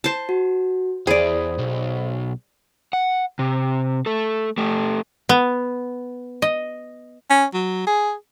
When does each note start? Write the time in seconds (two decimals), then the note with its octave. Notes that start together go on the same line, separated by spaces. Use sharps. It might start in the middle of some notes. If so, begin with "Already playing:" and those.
0.04 C5 A5
0.29 F#4
1.07 E2 G#4 C5 D5 G5 B5
1.59 B1
2.93 F#5
3.39 C3
4.06 A3 A4
4.58 A3 G4
5.29 B3
6.42 D#5
7.30 C#4
7.54 F#3
7.87 G#4